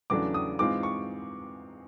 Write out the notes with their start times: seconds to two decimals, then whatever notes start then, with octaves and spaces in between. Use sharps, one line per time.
0.10 E2 C#3 F#3 A3 D4 D6
0.34 D#6
0.59 G#2 E3 G#3 C4 F4 D6
0.83 C#6